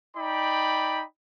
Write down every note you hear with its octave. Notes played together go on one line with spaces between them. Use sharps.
D#4 D5 G5 B5